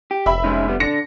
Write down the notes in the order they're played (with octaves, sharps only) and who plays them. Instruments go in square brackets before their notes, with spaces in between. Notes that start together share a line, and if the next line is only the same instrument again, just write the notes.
[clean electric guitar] G4
[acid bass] F1 [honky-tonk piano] E5 B5
[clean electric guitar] G#3 C#4 D#4
G3 B3
[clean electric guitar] D3 D4 [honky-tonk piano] A#6 C#7